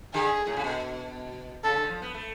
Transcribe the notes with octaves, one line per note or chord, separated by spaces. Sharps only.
D3 G#4
A2
C#3
B2
C#3 A4
D3
F3
B3
A3